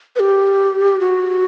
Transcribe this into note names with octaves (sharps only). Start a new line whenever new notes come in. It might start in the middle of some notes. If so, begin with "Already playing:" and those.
B4
G4
F#4